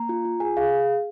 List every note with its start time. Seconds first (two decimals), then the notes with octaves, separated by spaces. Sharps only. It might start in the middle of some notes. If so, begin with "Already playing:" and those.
Already playing: A#3 A#5
0.09 F4
0.25 F4
0.40 G#4 G#5
0.57 G#4 F5